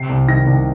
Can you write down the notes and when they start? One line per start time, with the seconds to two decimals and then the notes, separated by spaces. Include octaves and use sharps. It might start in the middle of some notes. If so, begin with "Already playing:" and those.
Already playing: C3 C7
0.10 C2
0.28 D#3 A#6
0.47 C2